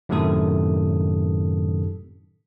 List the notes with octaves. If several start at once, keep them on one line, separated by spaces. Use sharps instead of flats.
F#2 A2 C3 D#3 A4 D#6